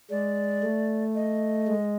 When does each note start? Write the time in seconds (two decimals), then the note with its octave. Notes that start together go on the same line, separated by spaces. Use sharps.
0.10 G#3 D5
0.63 A3
1.15 D#5
1.68 G#3